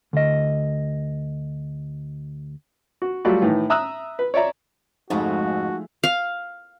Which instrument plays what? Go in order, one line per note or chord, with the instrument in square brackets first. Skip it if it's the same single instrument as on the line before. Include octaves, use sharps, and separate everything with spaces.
[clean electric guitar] D2 D#5
[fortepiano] F#4
F#3 G3 A3 F4 F#4
A2 D#3 E3
E5 A#5 D#6 E6 F#6
B4
C#5 D5 E5 A#5
[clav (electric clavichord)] F2 G#2 C#3 [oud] F3 G#3 A3 [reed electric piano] D#4 [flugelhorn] F#4
[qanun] F5